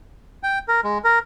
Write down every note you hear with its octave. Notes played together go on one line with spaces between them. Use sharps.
G5
A#4
G#3
A#4